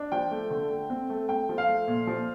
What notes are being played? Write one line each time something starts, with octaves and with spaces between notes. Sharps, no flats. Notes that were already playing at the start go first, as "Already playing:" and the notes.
Already playing: D4
F3 G5
A3
D3
A3
C4
A3
A3 G5
F3
F5
A3
A#2
F3